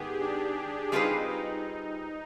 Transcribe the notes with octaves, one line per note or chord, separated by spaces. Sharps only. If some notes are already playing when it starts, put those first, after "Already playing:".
Already playing: G#2 D#3 B3 G4 G#4
D4
G3 C4 D#4 F4 G#4 B4
D#4